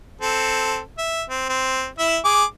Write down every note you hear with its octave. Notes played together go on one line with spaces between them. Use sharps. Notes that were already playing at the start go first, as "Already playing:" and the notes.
C4 A4
E5
C4
C4
E4 E5
G#4 D6